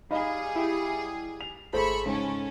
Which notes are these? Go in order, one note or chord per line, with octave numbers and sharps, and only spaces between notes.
G3 D#4 G#4 D#5 F5 B5
E4 G4 G5
F7
G#1 A3 G#4 A4 C5 B5 C#6 E7
G#2 C#3 C#4 A4 D7